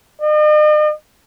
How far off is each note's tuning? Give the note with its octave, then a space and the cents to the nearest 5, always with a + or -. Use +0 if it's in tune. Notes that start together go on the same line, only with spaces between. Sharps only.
D#5 -45